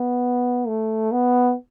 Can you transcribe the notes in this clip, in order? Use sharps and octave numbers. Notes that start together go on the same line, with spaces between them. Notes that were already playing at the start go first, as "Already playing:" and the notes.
Already playing: B3
A3
B3